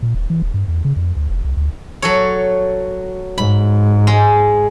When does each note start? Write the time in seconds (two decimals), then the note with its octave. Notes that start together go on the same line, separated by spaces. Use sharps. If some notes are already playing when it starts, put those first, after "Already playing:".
0.02 A#2
0.15 D#1
0.30 E3
0.42 D#1
0.54 G2
0.68 E2
0.85 C#3
0.97 F2
1.17 D2
1.30 F1
1.45 C2
1.57 D2
2.02 F#3 A4 C#5
3.38 G#2 B5
4.07 G#3